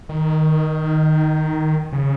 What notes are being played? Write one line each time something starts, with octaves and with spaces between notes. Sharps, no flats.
D#3
C#3